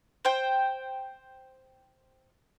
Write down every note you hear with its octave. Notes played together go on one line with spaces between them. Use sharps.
C5 G5